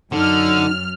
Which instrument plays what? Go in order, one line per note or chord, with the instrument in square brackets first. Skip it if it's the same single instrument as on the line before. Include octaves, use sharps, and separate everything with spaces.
[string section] F#2 F6 [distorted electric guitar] D3 [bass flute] D#4